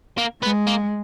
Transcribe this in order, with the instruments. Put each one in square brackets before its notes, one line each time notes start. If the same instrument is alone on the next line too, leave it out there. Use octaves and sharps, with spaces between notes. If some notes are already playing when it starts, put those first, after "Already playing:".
[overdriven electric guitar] A#3
[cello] G#3 [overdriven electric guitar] B3
[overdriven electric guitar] A#3